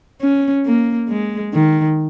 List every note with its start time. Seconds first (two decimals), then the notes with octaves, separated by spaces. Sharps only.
0.21 C#4
0.66 A#3
1.09 G#3
1.53 D#3